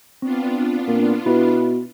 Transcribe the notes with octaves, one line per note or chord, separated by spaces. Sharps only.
B3 C4 D4 F4
A#2
B2 E4 B4